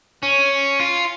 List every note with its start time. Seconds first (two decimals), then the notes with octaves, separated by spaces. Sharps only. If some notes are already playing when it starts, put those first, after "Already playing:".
0.23 C#4
0.80 F4